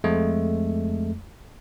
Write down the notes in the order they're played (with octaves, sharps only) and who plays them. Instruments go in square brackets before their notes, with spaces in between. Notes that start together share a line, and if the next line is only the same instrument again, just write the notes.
[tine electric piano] F2 G#3 A3